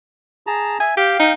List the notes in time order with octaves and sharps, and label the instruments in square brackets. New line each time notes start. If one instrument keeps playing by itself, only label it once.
[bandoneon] G#4 A5 A#5
[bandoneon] E5 [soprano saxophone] G#5
[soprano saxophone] G4 [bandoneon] F5 G5
[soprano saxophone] D#4